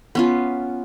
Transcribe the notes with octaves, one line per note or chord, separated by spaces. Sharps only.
B3 C#4 F4